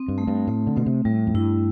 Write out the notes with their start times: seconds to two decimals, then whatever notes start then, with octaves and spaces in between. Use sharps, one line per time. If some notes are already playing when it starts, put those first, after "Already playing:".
Already playing: C4
0.08 G2
0.18 A3
0.27 G2
0.47 A2 A3
0.67 D3
0.76 B2 A3
0.86 C3
1.05 A2 G3
1.27 F2
1.34 G2 E4